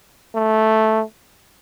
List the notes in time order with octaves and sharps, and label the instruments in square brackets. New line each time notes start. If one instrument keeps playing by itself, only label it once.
[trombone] A3